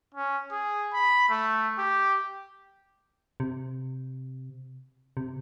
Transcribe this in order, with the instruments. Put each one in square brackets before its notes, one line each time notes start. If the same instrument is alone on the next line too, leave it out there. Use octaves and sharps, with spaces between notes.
[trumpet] C#4
G#4
B5
A3
G4
[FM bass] C3
C3